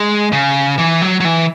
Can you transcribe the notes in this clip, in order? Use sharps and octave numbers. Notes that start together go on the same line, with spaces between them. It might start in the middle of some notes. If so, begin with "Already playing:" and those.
Already playing: G#3
C#3
E3
F#3
F#3
E3